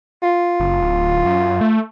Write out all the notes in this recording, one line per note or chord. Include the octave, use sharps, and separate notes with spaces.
F4
F#1
D1
F#2
A3